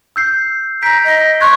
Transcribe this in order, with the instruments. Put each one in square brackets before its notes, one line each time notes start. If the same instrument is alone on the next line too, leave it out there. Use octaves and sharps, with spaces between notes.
[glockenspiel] E6 G6 C7
[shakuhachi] A#5 [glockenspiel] G6 B6 D7
[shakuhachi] D#5
[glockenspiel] C6 F#6 G#6 [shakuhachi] C#6